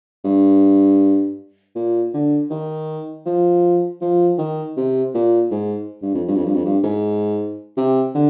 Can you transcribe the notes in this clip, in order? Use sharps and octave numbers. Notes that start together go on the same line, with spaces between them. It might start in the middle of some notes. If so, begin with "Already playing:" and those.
G2
A#2
D3
D#3
F3
F3
D#3
C3
A#2
G#2
G2
F2
G2
F2
G2
F2
G2
G#2
C3
D3